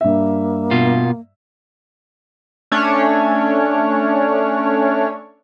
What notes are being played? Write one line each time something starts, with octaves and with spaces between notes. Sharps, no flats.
G2 A#3 E5
B2 F4
A3 C#4 D4 C#5